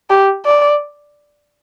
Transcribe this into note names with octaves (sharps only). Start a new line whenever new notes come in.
G4
D5